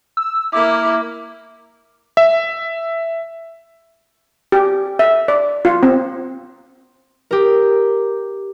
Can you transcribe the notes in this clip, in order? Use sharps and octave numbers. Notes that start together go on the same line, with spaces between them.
E6
A#3 E4 D6
E5
G4
E5
D5
F4
C4
G4 A#4